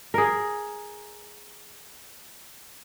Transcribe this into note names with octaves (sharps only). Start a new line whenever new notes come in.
G#4 A#4